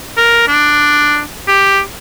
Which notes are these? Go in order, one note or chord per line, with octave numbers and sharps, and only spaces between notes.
A#4
D4
G4